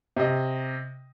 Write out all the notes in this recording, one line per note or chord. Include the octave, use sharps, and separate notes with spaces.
C3 D#5